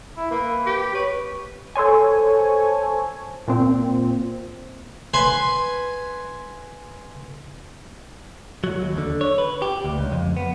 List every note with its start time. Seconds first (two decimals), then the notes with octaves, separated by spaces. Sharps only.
0.17 E4
0.31 A#3 B4
0.66 G4
0.94 B4 C#5
1.75 A4 C5 C#5 G#5
3.48 A#2 C4
5.14 B4 G#5 C6
8.64 F#3
8.82 D#2
8.98 D3
9.21 C#5
9.38 B4
9.62 G4
9.84 D2
9.98 C#2
10.12 F2
10.37 B3